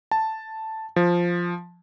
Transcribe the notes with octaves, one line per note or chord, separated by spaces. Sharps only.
A5
F3